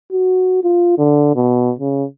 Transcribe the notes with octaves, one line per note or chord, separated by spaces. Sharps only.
F#4
F4
D3
B2
C#3